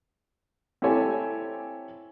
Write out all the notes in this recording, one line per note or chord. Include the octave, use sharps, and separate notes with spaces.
C4 E4 G4 A4 C#5 G#5